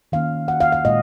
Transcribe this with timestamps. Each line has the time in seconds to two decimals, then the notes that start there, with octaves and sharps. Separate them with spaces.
0.12 D#3 A#3 C#4 F5
0.48 F#5
0.60 F5
0.72 F5
0.85 A#2 G#3 D#5